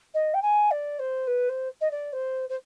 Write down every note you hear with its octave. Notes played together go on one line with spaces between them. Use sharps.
D#5
G5
G#5
D5
C5
B4
C5
D#5
D5
C5
C5